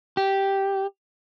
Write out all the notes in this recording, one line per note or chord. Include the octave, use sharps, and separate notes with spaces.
G4